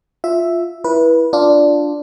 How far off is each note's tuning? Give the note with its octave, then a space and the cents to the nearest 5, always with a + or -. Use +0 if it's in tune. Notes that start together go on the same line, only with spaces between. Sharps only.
F4 +0 E5 +0
E4 +0 B4 -25
D4 +0 F4 +0